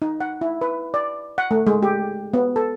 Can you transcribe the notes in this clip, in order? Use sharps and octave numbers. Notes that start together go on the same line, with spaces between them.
D#4
F#5
E4
B4
D5
F#5
A3
G#3
G4
B3
A4